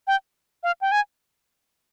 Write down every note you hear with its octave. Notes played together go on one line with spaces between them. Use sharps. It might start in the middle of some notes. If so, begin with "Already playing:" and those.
G5
F5
G5
G#5